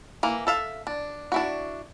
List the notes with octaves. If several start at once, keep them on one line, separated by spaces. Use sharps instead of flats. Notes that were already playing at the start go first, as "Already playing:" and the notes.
E3 A#3
A4 E5 F5
D4
D4 E4 F#4